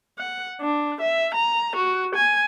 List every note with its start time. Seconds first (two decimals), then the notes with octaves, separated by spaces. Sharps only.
0.19 F#5
0.61 D4
1.01 E5
1.35 A#5
1.76 F#4
2.15 G#5